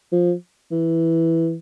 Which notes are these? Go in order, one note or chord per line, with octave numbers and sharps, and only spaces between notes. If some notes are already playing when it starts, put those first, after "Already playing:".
F3
E3